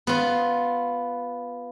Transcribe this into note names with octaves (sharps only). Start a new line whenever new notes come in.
B3 F4